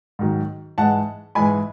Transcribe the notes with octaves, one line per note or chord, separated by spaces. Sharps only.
G#2 D#3 F#3
G#2 E3 G#3 F#5 A5
G#2 E3 G#3 G#5 B5